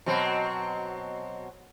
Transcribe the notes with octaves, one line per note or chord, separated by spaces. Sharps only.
B2 F#3 C4